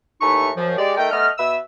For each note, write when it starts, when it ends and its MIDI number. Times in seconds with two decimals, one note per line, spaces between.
0.21 0.50 39
0.21 0.50 52
0.21 0.50 57
0.21 0.50 63
0.21 0.50 64
0.21 0.50 85
0.57 0.76 42
0.57 0.76 53
0.77 0.97 56
0.77 0.97 67
0.77 0.97 74
0.97 1.11 57
0.97 1.11 63
0.97 1.11 70
0.97 1.11 79
1.11 1.28 57
1.11 1.28 59
1.11 1.28 75
1.11 1.28 89
1.38 1.56 47
1.38 1.56 71
1.38 1.56 76
1.38 1.56 88